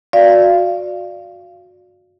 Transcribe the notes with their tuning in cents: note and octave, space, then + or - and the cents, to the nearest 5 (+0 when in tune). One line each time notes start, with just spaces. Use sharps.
F#4 -25 D5 +0 F5 -25